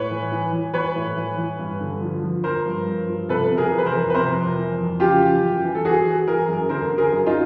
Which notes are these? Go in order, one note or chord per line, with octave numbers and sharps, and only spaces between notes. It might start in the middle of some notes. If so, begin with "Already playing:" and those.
Already playing: A2 B4 C#5
E3
E3
E3
E3 B4 C#5
A2
E3
E3
G2
D3
F3
F3
F3 A#4 C5
G2
G2
F3
C3 A4 B4
C3
G#4 A#4
E3
B4
A#4 C5
F2
B4
C3 A#4 C5
F2
E3
F2
C#3 F4 G4
E3
F#2
E3
A4
E3 F#4 G#4
E3
E3 G#4 A#4
F#2
D3 A#4 C5
D3
G#4 A#4
F#2
D#4 F4